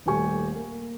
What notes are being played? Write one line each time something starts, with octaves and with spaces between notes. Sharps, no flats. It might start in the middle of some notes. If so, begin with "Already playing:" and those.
D#1 G3 A3 G4 G#5 C#6
A#3